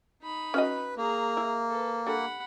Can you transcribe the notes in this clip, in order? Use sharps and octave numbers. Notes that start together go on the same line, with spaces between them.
D#4 B5
C#4 F#4 B4 D#5
A#3 G#4 A#5
E4
A4 B4
G3 D4 A4 F#5 B5